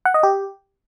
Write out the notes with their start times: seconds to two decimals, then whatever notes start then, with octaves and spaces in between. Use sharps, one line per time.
0.05 F#5
0.14 D#5
0.23 G4